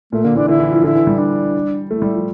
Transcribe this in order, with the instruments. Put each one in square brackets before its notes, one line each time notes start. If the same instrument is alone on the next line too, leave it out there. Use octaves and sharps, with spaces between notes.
[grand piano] A#2 [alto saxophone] A3
[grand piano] D3 [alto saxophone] A#3
[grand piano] E3 [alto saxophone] D4
[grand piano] D3 [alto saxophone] E4
[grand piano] E3
F3
[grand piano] D3 [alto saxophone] E4
[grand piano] E3
G3
[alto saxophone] D4
[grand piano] A3 [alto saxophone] E4
[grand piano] G3
F3